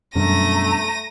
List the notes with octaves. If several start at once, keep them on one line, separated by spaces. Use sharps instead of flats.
F#2 B2 G3 A3 D4 A#5 A#6 D#7